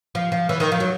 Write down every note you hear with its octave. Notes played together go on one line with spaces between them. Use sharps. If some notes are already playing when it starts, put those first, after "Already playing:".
F3
F3
E3
D#3
F3
F#3